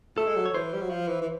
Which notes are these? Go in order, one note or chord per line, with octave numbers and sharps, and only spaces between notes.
A3 A4
G#3
F#3
C#5
E3 C5
G3
F#3
F3
E3
E3